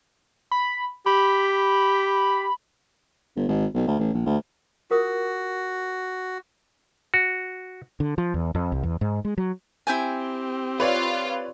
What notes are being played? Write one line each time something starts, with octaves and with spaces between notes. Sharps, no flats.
B5
G4 B5
G1
G#1
B1
D2
A1
A#1
D2
F4 F#4 A#4 D#6
F#4
D3
F3
E2
F2
C2
E2
G#2
G#3
F#3
C4 E4 G4 G5 G#5
F4 B4 C#5 D5